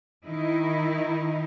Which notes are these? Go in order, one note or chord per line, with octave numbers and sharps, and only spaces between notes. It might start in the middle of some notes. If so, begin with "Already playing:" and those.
D#3 D#4 E4